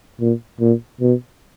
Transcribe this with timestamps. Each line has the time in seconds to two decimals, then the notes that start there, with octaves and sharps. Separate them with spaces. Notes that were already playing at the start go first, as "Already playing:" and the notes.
0.20 A#2
0.61 A#2
1.01 B2